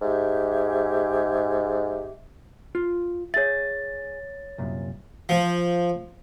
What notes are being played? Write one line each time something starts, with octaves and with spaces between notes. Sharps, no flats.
G#2 G4 G#4 E5
F4
G#4 C#5 E5 A6
C2 F#2 A#2
F3